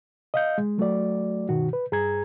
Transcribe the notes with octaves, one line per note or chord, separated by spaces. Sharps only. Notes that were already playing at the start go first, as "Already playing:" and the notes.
D#5 F5 G6
G#3
F#3 A3 F#4 D5
G2 B2 D#3 F#4
B4
G2 G#4 A#5 G#6